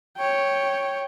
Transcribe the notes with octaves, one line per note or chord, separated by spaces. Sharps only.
C#5 G5